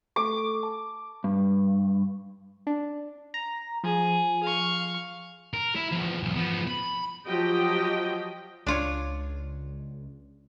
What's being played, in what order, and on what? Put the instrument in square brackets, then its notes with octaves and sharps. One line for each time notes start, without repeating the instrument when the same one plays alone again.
[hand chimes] A3 A4 C#6 [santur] D6
[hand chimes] A5
[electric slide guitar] G2
[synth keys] D4
A#5
[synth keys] F3 [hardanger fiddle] G#4
[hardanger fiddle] F5 C#6
[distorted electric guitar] A#4
E4
E2 F3
B1 E2
F3 B3
B5
[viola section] F3 F#3 G4 D#5 G5
[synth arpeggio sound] C#2 [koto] D4 F4 C#5